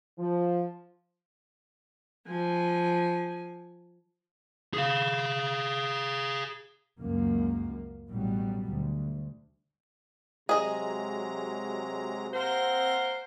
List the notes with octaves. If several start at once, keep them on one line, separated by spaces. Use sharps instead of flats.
F3
F3 G#5
G#4 F5
C#2 F#2 A#3
A1 B2 F#3 G3
D2
C3 F#3 G#3 G#4 D#5 A#5
A#3 C4 C5 F#5 A#6